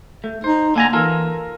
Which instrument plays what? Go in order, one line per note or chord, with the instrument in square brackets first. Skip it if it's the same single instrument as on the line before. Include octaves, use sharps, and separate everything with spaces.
[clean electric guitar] A3
[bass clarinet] D#4 [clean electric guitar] C5
[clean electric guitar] D3 G#5 A#5 [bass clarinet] A#3
[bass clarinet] E3 [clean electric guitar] F4 A4 A#4